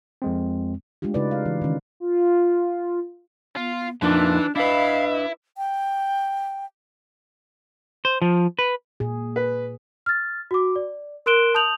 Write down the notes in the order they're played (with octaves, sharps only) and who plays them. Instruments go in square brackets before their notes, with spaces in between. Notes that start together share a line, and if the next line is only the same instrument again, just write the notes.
[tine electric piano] F2 G#3 C4
[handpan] G#3 A3 D4 F4 G4
C#3 D#4 F4 F#4 B4 D5
F5
E3
D#3 C#4
[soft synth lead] F4
[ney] B3 [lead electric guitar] F4
[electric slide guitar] F2 F3 A#3 [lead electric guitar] E3 [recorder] D4 [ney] D#4
[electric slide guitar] D4 B4 [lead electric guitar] E4 [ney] D#5 [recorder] F5
[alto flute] G5
[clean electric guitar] C5
F3
B4
[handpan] A#2 G#4
[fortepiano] B4
[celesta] F6 A6
F#4 D6
D5
A#4 C6 F#6 D7 E7 G7
A5 D#6 G6 F7 F#7